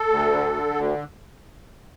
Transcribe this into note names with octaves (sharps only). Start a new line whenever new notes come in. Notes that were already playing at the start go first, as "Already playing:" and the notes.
Already playing: A4
D2
D3
D3
D2